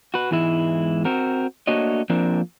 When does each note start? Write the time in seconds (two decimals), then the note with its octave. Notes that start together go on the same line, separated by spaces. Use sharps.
0.14 F#4 B4
0.31 E2 G#2 E3 G#3 E4
1.05 C4 F#4 A#4
1.67 A3 A#3 D4 F#4 C#5 D#5
2.10 F3 A#3 C4 D4 A#4